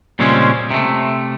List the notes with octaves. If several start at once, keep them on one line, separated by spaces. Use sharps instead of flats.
A#2 C#3 G3 G#3 C4 C#4
C3 A3